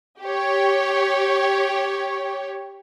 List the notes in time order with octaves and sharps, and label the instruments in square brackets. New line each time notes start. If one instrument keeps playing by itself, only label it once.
[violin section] G4 C#5